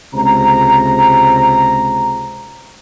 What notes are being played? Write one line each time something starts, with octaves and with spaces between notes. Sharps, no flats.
C#2 C3 C5 A#5